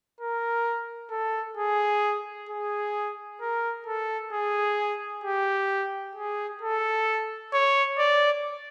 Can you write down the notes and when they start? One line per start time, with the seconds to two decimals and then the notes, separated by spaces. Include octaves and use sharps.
0.20 A#4
1.11 A4
1.57 G#4
2.49 G#4
3.41 A#4
3.86 A4
4.33 G#4
5.24 G4
6.15 G#4
6.62 A4
7.53 C#5
7.99 D5